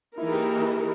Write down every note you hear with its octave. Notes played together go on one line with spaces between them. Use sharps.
E3 A#3 D#4 E4 A#4
G#4
G4
G4